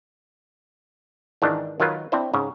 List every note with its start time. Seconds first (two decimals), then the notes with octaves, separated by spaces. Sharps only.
1.42 G#2 D#3 E3 D4
1.80 D#3 F#3 F4 A#4 B4
2.12 C4 D4 E4 C5
2.33 G#2 C#3